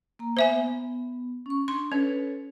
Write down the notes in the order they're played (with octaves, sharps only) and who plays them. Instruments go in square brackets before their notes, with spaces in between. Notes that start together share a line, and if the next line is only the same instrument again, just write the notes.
[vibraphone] A#3 A#5
[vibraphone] B3 [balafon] C5 E5 G#5
[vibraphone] C#4 C#6
[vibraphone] D4 [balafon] C6
[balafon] C#4 [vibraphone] A4 B4 C#5